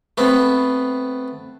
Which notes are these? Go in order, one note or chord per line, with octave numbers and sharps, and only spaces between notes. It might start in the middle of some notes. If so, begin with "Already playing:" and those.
A3 B3 C4